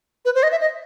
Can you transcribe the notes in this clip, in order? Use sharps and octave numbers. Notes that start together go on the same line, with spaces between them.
B4
C5
D#5
E5
D#5